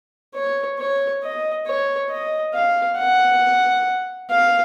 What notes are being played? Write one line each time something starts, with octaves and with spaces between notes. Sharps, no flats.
C#5
C#5
D#5
C#5
D#5
F5
F#5
F5